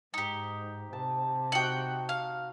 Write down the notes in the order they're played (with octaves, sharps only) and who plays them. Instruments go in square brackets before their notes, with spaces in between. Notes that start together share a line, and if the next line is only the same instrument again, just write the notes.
[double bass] G#2 [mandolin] D#4 G4
[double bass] C3 [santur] A5
[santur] D#4 F#4 [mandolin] F#5 G5
[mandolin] F5